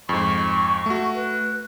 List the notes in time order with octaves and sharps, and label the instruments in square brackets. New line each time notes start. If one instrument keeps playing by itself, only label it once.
[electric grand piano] F2 G#2 [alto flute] C#6
[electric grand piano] A3 F#4
[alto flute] B4